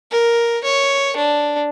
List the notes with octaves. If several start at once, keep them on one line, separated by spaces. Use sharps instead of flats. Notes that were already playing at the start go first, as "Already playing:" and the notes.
A#4
C#5
D4